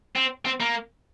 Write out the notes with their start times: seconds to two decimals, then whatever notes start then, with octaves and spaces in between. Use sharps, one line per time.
0.15 C4
0.45 C4
0.60 A#3